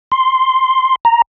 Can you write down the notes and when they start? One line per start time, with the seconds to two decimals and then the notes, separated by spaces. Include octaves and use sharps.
0.12 C6
1.05 A#5